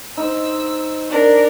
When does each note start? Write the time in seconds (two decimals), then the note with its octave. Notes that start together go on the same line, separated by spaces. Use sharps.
0.17 D#4 C5 E6
1.10 D4 A#4